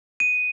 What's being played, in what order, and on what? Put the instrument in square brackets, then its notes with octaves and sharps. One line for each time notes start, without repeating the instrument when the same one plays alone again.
[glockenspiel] D#7